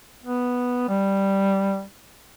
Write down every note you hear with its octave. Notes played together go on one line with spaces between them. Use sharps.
B3
G3